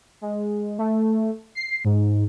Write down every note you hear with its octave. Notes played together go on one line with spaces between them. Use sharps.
G#3
A3
C7
G#2